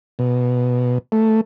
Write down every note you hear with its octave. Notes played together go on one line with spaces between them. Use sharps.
B2
A3